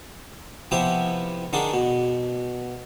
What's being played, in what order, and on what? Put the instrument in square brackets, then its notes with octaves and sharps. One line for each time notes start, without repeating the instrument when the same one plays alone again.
[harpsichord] C3 F3 B3 E4 G4
D3 D#3 D4 G#4
B2